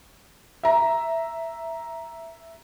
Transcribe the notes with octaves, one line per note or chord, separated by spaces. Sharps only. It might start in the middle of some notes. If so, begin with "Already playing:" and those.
E5 A#5